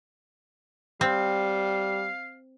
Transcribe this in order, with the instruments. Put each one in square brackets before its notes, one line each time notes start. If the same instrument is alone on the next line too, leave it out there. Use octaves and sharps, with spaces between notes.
[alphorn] G3 [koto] C4 [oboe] F5